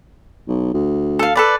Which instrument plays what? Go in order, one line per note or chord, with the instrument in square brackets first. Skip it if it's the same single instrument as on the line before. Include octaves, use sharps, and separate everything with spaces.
[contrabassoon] B1
D2
[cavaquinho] A4 F5
A4 B4 D5